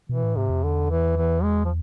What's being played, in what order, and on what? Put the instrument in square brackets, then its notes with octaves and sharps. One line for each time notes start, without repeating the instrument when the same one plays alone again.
[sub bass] B2 [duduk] E3
[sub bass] A2
[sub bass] G#2 [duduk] C3
[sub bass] F2
[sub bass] E2 [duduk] D3
[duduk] E3
E3
G#3
F3